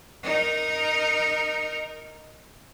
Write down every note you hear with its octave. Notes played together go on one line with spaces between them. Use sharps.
D#4 A#4